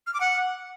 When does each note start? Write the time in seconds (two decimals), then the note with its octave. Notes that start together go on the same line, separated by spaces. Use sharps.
0.07 F6
0.14 D6
0.21 F#5